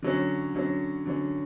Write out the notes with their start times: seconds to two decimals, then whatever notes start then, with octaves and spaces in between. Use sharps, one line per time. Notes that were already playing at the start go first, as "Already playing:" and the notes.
0.02 D3 F#3 C#4
0.54 D3 F#3 C#4
1.05 D3 F#3 C#4